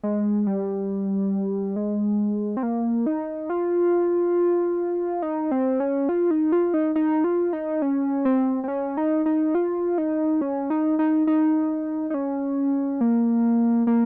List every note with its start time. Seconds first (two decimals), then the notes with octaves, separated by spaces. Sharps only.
0.03 G#3
0.47 G3
1.76 G#3
2.57 C4
2.63 A#3
3.06 D#4
3.50 F4
5.22 D#4
5.51 C4
5.80 C#4
6.09 F4
6.31 D#4
6.52 F4
6.74 D#4
6.96 D#4
7.24 F4
7.53 D#4
7.82 C#4
8.25 C4
8.64 C4
8.68 C#4
8.97 D#4
9.26 D#4
9.55 F4
9.98 D#4
10.41 C#4
10.70 D#4
10.99 D#4
11.27 D#4
12.10 D#4
12.14 C#4
13.01 A#3
13.87 A#3